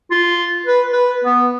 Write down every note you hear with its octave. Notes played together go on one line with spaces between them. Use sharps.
F4
B4
B4
B3